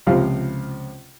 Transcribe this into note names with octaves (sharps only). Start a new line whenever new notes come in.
C#2 C3 F3 C5 F5